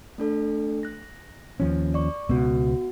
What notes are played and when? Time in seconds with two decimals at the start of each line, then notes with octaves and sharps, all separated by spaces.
0.18 A3 D4 A4
0.83 F#6 A#6
1.60 D#2 F3 C#4
1.94 D5 C#6
2.29 C#2 B2 B3 F#4